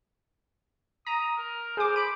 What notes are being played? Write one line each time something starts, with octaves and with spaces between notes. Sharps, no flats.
A#5 D#6
A#4
G#4 C5 D6
B5 D7